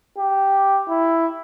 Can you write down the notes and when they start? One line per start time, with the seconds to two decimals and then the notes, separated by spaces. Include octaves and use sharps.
0.18 G4
0.89 E4